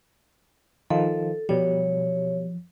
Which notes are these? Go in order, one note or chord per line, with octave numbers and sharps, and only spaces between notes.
D#3 F3 A4
B2 F3 G3 C#5